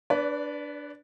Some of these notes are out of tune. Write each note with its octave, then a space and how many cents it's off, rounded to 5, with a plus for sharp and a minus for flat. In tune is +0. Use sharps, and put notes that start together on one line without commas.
D4 +0 B4 +0 D5 -40